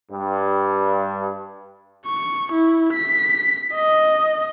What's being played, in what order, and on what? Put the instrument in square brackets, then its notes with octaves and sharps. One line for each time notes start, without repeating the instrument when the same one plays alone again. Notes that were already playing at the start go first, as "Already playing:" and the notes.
[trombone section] G2
[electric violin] C#6
E4
B6
D#5